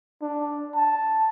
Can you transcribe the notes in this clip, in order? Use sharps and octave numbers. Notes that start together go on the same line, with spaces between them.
D4
A5